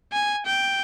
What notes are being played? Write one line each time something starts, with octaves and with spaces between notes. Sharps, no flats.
G#5
G5